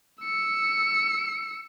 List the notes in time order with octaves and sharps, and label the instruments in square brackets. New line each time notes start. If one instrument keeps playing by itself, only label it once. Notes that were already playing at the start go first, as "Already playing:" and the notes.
[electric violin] E6 C#7